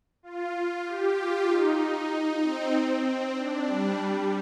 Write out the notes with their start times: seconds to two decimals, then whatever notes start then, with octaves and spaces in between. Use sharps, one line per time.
0.23 F4
0.85 G4
1.17 F4
1.47 D#4
1.79 D#4
2.42 C4
3.35 D4
3.66 G3
3.97 G3